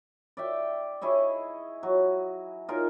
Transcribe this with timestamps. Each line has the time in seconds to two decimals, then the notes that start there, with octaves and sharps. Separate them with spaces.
0.37 D5 E5 G5
1.02 E4 G#4 C#5 D#5
1.83 F#3
2.68 D#4 F4 G#4 A#4